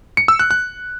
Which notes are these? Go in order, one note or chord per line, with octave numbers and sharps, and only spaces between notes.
C#7
E6
F#6
F#6